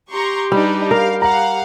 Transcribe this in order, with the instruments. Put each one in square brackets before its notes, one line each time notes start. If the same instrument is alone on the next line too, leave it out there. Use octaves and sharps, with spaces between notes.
[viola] G4 [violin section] A#5 C6 C#6
[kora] G3 [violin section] D4 D#4 B4
[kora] A#4 [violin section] F5
[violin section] F5 F#5 [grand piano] A#5